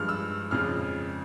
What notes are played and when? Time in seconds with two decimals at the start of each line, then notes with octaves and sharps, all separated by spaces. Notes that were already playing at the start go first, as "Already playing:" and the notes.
Already playing: G2 F3 G#3 F6
0.09 E6
0.51 F2 C#3 F3 G#3 F6